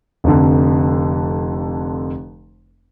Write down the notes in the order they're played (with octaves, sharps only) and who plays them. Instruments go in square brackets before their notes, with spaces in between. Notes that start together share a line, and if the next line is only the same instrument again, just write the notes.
[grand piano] F1 F2 D3